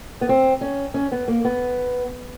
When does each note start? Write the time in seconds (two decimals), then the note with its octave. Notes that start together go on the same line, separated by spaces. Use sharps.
0.21 B3
0.29 C4
0.61 C#4
0.94 C#4
1.12 B3
1.28 A#3
1.45 B3